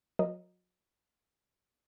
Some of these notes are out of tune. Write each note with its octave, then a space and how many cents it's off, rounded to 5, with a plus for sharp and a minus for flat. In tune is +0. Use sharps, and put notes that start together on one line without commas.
F#3 -40 A#4 +0 D#5 -20